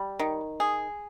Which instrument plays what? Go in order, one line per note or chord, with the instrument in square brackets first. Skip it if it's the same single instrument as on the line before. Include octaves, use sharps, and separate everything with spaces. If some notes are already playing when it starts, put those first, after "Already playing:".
Already playing: [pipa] G3
D#3
G#4